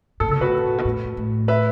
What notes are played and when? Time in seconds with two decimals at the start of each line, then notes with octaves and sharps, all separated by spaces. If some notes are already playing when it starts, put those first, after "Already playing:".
0.20 A2 A4
0.29 C#3
0.31 B2 A4
0.41 A2 F#4 B4
0.78 B2
0.85 A2
1.17 A2
1.48 B4 E5